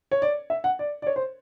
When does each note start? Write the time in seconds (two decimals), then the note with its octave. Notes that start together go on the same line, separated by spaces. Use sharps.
0.11 C#5
0.22 D5
0.50 E5
0.64 F#5
0.79 D5
1.02 D5
1.07 C#5
1.16 C5